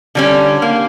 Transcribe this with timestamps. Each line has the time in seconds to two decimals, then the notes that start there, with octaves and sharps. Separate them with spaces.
0.15 D3 G3 C#4
0.62 A#3